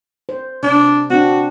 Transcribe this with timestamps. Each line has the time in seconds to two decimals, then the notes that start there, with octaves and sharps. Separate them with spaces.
0.29 C5
0.63 C3 D4
1.10 C4 D4 F#4